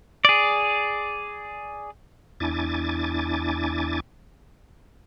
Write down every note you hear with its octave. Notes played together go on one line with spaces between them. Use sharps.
G#4 D5
E2 D4 E4 G#5 D6 A6